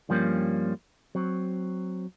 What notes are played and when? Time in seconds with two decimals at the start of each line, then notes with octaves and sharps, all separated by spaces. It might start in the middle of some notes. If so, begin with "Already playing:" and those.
0.09 G2 F3 G3 A#3 C#4
1.15 F#3 C4